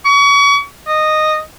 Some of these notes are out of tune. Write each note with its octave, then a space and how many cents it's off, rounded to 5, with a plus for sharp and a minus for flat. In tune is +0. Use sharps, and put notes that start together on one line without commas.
C#6 +35
D#5 -10